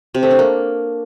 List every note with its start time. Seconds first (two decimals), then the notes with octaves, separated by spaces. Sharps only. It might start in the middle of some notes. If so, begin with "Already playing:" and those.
0.14 C3
0.23 A3
0.31 D4
0.39 A#3